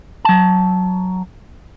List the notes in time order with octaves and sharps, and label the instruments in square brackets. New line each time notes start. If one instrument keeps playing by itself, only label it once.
[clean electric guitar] F#3 A5